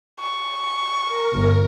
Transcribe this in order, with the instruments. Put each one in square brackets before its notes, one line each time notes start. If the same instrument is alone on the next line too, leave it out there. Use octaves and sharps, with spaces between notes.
[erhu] C#6
[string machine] A#4
[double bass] G1